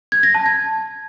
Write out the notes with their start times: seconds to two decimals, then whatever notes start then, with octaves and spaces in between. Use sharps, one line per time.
0.12 G#6
0.23 A#6
0.35 A5
0.46 G#6